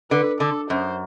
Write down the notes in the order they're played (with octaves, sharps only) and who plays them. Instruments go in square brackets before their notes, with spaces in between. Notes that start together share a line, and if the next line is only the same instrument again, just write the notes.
[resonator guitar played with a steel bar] D3 [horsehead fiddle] B4
[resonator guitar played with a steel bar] D3 [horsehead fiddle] A4
[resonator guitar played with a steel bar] F#2 [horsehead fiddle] C5